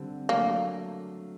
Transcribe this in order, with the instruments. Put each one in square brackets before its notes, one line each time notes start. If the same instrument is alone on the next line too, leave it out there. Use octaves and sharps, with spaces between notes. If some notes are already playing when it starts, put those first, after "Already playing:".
Already playing: [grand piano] D3 G3 C4
[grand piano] F#3 A3 D4 [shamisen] A#3